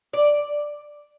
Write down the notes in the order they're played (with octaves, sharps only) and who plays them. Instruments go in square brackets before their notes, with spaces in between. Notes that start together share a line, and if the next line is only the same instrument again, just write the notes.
[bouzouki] D5